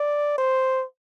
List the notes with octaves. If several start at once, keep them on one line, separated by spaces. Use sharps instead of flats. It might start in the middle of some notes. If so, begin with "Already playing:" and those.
Already playing: D5
C5